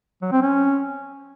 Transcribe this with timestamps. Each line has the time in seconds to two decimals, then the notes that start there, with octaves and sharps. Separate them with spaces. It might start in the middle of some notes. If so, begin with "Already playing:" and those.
0.22 F#3
0.32 C4
0.42 C#4